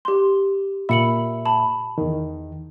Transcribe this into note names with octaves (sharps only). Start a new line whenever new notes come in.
G4 C6
A#2 E5 B5 C#7 F#7
A5 B5
E2 D#3